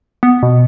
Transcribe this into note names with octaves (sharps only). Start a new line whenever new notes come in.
B3
B2